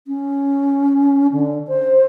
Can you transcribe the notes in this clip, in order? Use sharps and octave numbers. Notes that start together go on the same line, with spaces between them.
C#4
D3
C5